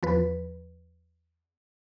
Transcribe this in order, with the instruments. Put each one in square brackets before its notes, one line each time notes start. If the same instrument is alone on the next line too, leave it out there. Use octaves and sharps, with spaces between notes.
[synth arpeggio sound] E2 F3 B4